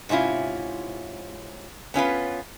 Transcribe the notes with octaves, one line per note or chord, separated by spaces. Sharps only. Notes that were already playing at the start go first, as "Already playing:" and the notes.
G#2 C3 C#4 E4 F4
B3 C#4 F4 B4